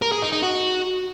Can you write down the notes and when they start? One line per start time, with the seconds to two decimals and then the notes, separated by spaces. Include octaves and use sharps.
0.02 A#4
0.12 G#4
0.22 D#4
0.32 D#4
0.42 F#4